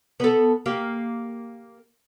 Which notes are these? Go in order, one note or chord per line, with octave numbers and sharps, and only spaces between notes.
B3 A4
A#3 G4